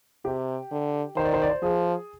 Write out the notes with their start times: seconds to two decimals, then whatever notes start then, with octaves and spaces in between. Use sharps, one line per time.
0.25 C3 G4
0.71 D3
1.16 D#3 C5
1.24 D5
1.34 C5
1.42 D5
1.50 C5
1.62 F3 G#4